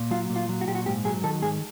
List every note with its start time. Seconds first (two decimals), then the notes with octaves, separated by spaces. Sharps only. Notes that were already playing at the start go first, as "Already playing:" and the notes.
Already playing: A#2
0.11 F#3 F4
0.30 A#2
0.36 F4
0.49 F#3
0.61 F#4
0.67 A#2 G4
0.75 F#4
0.86 G#2 G4
1.05 F#3 G#4
1.23 D#3 A4
1.42 G#2 G#4